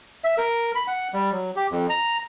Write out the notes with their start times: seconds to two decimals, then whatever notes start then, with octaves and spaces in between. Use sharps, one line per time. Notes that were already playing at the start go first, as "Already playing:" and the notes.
0.24 E5
0.38 A#4
0.75 B5
0.87 F#5
1.13 G3
1.32 F#3
1.56 G4
1.71 F2
1.90 A#5